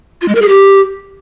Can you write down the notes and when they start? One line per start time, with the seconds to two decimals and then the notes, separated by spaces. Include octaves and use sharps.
0.22 F4
0.28 G#3
0.35 A#4
0.42 G#4
0.49 G4